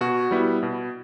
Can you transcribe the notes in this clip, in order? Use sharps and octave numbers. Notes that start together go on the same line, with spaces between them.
B2 F#4
G3 B3 E4
B2